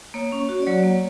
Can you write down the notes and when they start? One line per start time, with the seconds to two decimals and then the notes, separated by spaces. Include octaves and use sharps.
0.14 A#3 C#5
0.32 C#4
0.49 F#4
0.62 D5
0.67 F#3 C#5
0.84 A#3